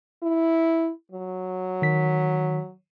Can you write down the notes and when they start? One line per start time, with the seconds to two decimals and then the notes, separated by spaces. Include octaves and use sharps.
0.22 E4
1.12 F#3
1.82 D#3 B6